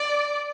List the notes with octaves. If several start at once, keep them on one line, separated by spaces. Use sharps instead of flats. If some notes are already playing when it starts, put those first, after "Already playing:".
Already playing: D5